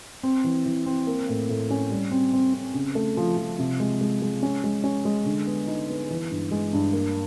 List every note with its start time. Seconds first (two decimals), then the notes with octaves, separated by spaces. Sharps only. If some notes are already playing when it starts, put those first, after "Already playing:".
0.23 C4
0.44 E3
0.66 E3
0.86 C4
1.07 A#3
1.28 A2
1.49 A2
1.70 C#4
1.90 G3
2.11 C4
2.33 C4
2.54 C4
2.74 C#3
2.95 A3
3.17 F3
3.37 F3
3.59 C3
3.80 G#3
4.01 G#3
4.22 G#3
4.42 C#4
4.64 G#3
4.84 C#4
5.05 G#3
5.25 D3
5.47 B3
5.68 D#4
5.89 B3
6.10 E3
6.31 G2
6.51 G#3
6.73 G2
6.93 A#3